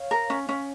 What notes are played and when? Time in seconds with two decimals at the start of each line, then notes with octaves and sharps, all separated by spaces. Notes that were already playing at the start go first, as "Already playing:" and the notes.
Already playing: C#5 F5
0.11 A#4
0.30 C#4
0.49 C#4